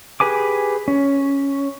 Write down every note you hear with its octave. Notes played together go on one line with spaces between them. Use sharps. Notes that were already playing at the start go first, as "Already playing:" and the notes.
G4 G#4 B4 G#5 D6
C#4